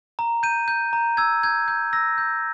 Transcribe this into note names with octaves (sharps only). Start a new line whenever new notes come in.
A#5
G6 D#7
G6
A#5
E6 G#6
G6 G#6
G6 G#6
E6 A#6
G6